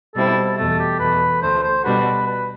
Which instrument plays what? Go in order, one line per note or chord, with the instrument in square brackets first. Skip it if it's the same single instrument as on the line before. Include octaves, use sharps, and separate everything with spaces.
[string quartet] B2 G3 C4 E4 [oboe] A4
[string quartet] E2 B2 A3 [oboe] A4
[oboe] G4
[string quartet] E2 B2 A3 [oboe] B4
[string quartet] D2 D3 A3 [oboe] C5
[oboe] C5
[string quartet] B2 G3 D4 F#4 [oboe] B4
[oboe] B4